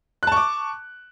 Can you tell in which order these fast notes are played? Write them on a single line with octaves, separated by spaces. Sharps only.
F#6 A5 C#6 D6